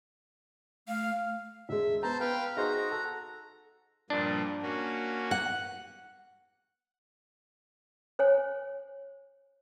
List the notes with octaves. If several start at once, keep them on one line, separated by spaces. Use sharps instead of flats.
A3 F5
E1 G#3 E5
B3 C5 A5 A#5
B3 B4 F5 G5
D#4 F#4 G#4 C5 A#5
A4
G2 A#2 F3 D4
A#3 C#4 F#4
F#5
C5 C#5 G#5